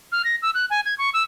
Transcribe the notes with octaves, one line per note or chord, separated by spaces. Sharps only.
F6
A#6
E6
F#6
G#5
G#6
C#6
E6